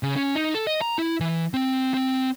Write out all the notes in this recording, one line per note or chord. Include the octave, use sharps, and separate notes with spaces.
C#3
C#4
D#4
A4
D#5
A#5
E4
E3
C4
C4